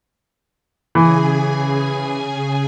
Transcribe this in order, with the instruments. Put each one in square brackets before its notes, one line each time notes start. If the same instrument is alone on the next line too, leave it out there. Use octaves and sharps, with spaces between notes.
[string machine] C#3 G#4 G#5 [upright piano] E3